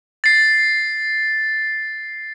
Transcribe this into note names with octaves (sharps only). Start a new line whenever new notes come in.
A6 C7